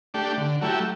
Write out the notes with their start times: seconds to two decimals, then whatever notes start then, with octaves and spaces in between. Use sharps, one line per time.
0.14 A3 D4 G4
0.37 D3
0.61 F#3 A3 E4 G4